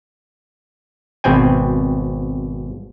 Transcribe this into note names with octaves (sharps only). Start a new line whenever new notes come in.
G#1 B2 C4 G5 G#5